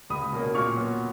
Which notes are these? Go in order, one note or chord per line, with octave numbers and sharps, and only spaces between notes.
C#2 B5 D#6
B2 A#3 C#4
A#2 C#6 F6
F#3 B3